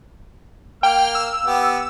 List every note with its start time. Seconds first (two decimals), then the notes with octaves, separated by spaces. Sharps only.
0.83 A#3 G5 F6
1.15 E6
1.46 B3 G4